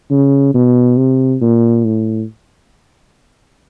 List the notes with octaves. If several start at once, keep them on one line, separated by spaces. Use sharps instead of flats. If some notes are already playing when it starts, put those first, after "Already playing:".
C#3
B2
C3
A#2
A2